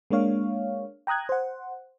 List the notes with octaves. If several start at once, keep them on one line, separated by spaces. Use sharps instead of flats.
G#3 A#3 D4 C#5 F5
G5 A#5 D#6 F#6 G#6
C5 F#5